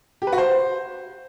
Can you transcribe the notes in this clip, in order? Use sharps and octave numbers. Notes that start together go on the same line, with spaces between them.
G4
B4
F#4
C5